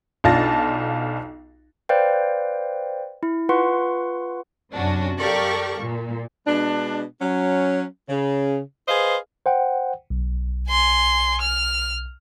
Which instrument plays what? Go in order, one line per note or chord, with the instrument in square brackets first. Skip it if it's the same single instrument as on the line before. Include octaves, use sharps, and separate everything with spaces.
[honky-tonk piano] B1 D4 F4 A5 A6 A#6
[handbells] B4 C5 D5 F5 G5
E4
F4 B4 F#5 C6 C#6
[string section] F#2 C3 C#4 D4 F#4
G4 A4 A#4 D5 F5 C#6
A#2
[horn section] B2 G#3 D4
F#3 C#4
C#3
G#4 B4 C5 D#5 F5
[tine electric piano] C5 F#5 G5
B1
[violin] G#5 C6
F6